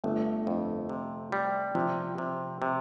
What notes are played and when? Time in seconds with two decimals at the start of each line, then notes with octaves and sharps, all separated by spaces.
0.04 G1 A3
0.47 F2
0.89 C3
1.32 G3
1.75 C3 F3
2.18 C3
2.62 C3